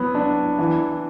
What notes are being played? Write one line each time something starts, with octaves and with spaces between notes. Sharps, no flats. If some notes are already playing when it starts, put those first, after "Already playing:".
Already playing: F#3 B3
D4
E3